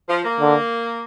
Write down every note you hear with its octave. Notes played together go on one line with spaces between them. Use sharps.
F3
A#3
D3